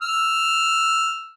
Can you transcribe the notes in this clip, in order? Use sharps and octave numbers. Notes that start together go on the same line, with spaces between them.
E6 F6